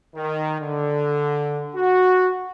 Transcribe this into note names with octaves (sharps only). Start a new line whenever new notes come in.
D#3
D3
F#4